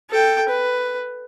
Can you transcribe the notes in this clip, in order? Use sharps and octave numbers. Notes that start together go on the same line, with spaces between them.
A4 G5
B4